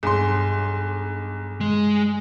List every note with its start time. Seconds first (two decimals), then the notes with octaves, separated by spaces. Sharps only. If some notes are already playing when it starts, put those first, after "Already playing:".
0.03 B1 G2 G#4 G#5 C6 D6
1.61 G#3